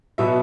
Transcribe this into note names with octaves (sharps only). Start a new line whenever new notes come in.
B2 F#3 B3 E5